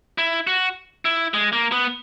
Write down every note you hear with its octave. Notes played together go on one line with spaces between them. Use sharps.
E4
F#4
E4
G#3
A#3
B3